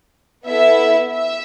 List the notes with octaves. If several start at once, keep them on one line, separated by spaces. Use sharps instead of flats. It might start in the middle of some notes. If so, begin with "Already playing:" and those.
B3 E4 A4 E5
E5